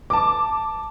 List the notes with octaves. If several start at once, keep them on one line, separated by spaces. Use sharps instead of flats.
A5 D6